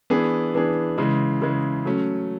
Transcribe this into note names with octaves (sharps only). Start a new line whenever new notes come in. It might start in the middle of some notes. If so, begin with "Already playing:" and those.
E3 B3 D4 G#4
E3 B3 D4 G#4
C#3 E3 G#3
C#3 E3 G#3
F#3 A3 C#4